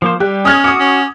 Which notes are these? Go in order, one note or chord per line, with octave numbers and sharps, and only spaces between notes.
F3 A#3 C5
G3 G4 F#6
C#4 D#6 F6 G#6
F#4 D6 D#6
C#4